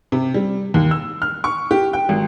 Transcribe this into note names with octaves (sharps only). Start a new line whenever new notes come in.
C3
G3
D#2
E6
F6
C#6
G4
G5
G#1